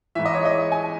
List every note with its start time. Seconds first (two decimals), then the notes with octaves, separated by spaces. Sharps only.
0.15 G#2 E3 E5
0.26 D#5
0.34 C#5
0.45 D#5
0.72 G#5